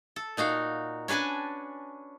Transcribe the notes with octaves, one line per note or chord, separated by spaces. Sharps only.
A4
A#2 D#4 F#4 F5
C#4 D4 B4 G#5 A5